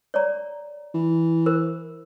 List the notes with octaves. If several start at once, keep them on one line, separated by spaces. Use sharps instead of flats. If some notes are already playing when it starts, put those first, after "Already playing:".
C#5 D5 A#5
E3
A#4 C5